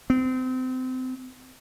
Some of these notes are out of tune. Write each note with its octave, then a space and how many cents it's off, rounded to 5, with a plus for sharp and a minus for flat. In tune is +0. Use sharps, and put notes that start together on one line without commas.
C4 -30